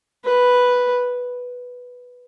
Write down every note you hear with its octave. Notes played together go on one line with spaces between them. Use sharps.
B4